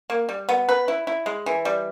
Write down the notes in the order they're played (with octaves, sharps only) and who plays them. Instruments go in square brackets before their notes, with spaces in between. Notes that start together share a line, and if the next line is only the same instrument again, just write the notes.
[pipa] A#3
G3
B3
B4
E4
E4
G#3
E3
G3